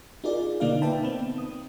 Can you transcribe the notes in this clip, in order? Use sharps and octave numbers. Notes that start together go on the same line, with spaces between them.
D#4 F4 G#4 A#4 D5
B2 D3 A#3 D#4 D5 F5
B4 E5 G5 A5 B5
B3 C4
D#6